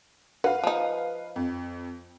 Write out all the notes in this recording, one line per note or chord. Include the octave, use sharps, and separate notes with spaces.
F#4 B4 F5
F3 D#4
F2